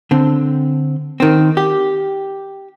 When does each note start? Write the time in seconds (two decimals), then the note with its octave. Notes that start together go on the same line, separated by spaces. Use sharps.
0.11 D3 C4
1.20 D#3 C4
1.57 G4